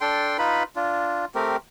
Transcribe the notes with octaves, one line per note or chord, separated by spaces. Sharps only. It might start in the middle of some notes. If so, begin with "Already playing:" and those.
D4 A4 G5 C6
D#4 F4 B4 B5
D4 F4
A3 C4 G4 A#4